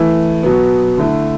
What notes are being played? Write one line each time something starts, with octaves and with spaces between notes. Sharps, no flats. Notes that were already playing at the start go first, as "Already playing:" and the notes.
Already playing: E3 A3 E4
B2 F#3 B3
D3 A3 E4